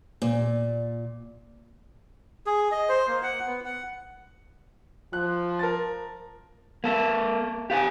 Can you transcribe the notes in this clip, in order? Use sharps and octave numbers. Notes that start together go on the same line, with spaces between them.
A#2
G#4
D#5
C5
A#3
F#5
B3
F#5
F3 F#6
A#4 A5 A6
A#3 A4
G4 F5 F#5 G#5